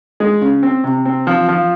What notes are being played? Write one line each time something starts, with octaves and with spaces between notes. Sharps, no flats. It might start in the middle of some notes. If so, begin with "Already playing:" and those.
G#3
C#3
C4
C3
C4
F3
F3